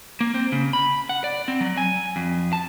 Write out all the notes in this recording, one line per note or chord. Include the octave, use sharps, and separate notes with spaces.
A#3
C4
C#3
B5
F#5
D5
C4
F#3
G#5
F2
A5